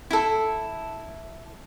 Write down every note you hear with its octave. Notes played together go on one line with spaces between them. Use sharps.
E4 A4